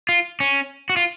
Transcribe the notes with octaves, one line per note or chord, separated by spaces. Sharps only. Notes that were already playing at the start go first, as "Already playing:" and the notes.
F4
C#4
F#4
F4